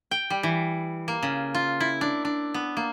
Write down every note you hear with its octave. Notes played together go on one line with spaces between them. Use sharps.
G5
G3
E3
A#3
C#3
F4
E4
D4
D4
B3
A#3